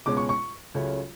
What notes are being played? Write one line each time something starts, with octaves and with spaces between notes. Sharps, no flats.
C#2 B2 G#3 C#4 D6
C#6
C#6
C#2 C#3 F#3 A3 C#4